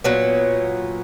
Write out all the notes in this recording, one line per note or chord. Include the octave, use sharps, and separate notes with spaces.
A#2 F#3 B3